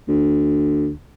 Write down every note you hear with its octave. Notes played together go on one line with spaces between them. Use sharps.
D2